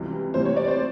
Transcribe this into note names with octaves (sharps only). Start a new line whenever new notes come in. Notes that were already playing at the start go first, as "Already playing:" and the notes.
Already playing: C#2 C3 E3 G3
D2 C3 E3 G3 C5
C#5
D5
C5